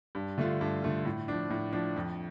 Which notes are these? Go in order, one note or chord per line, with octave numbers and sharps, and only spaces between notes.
G2
D3 A3 F4
G2
D3 A3 F4
A2
F3 D4
A2
F3 D4
F2